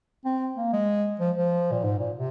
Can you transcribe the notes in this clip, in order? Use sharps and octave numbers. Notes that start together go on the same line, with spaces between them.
C4
A#3
G#3
F3
F3
A#2
G#2
A#2
C3